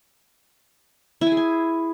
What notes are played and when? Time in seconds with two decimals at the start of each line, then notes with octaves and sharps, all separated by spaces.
1.21 E4
1.27 G#5
1.32 G#4
1.37 G#5